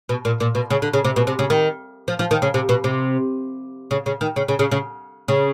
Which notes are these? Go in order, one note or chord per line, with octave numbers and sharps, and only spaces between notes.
B2
A#2
A#2
B2
C#3
D3
C#3
C3
B2
C3
C#3
D#3
F3
F3
D#3
C#3
C3
B2
C3
C#3
C#3
D#3
C#3
C#3
C#3
C#3
C#3